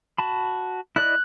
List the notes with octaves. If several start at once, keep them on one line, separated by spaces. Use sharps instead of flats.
F#4 A5 B5
E4 D5 D#5 F#6